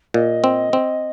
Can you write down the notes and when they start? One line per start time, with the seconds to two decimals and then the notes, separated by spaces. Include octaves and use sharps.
0.14 A#2 D#5
0.44 C4
0.73 C4